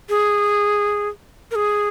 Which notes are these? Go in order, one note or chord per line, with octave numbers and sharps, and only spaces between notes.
G#4
A#4
G#4